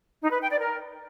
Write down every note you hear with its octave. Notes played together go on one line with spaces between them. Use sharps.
D#4
B4
G5
D5
A#4